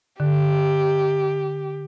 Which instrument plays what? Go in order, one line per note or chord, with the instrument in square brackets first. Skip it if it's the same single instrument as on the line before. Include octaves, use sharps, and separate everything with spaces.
[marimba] D3 [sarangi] G4